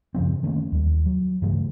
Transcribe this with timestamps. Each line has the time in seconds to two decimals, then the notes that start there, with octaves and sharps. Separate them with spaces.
0.14 F#2 C#3 F3 C4
0.43 D#3 A3 A#3 C#4
0.72 D#2 G3
1.06 F#3
1.42 G2 C#3 E3 A3